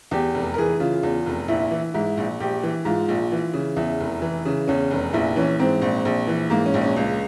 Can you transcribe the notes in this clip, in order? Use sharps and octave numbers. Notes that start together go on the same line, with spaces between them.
E2 G4
F1
A#4
E3 G#4
C#3 F4
E2
F1
A#1 E4
E3
G#2 E4
A#1
A#1 G4
E3
G#2 F4
A#1
E3
C#3
E2 E4
F1
E3
C#3
E2 C#4
F1
A#1 E4
E3 C#4
G#2 C4
A#1
A#1
E3
G#2 A#3
C#4
A#1
C#4
C#2